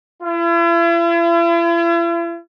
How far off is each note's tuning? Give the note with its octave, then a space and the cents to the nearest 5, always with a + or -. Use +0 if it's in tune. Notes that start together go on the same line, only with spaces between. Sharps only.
E4 +45